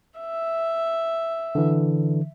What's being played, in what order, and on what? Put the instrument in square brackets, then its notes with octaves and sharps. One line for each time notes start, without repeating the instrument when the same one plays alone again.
[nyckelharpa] E5
[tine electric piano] D3 E3